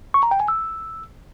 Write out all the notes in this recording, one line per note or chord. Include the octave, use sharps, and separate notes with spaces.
C#6
A#5
G5
G#5
E6